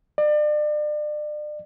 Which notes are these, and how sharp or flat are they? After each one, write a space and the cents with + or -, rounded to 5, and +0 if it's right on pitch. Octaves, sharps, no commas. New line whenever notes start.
D5 +35